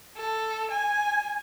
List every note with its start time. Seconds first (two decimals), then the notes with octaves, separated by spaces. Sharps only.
0.17 A4
0.71 G#5